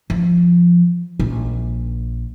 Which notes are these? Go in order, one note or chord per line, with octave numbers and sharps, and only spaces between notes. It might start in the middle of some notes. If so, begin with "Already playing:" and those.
F3
A#1